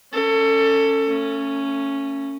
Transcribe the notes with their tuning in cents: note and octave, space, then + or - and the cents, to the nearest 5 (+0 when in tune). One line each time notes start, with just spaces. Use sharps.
C#4 +0 A4 +25
A3 +40 C#4 +0